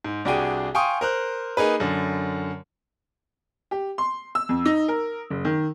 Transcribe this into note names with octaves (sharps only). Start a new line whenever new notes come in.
G#2
C2 D4 F#4 G#4 G5 D#7
F5 G5 G#5 C6 C#6 D#6
A#4 C5 F#6
A#3 D#4 G#4 B4
F#2 D3
G4
C6
E6
F2
D#4
A#4
F#1
D#3